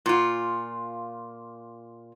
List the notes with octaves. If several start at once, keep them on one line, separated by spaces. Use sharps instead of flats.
A#2 F4